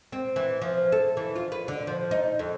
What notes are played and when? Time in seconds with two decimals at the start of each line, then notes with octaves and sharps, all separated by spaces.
0.12 C4
0.36 E3
0.62 F3
0.92 A4
1.17 E3
1.35 F4
1.52 B4
1.68 D3
1.87 F3
2.11 D#4
2.39 F2